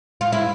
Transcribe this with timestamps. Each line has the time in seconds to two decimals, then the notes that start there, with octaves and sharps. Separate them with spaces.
0.21 F4
0.32 E4